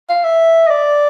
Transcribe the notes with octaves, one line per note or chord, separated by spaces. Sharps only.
F5
E5
D#5
D5